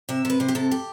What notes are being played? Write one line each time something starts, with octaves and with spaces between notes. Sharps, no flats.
C3 E5
C3 B4
C3 C5
G4
C3 A4
G4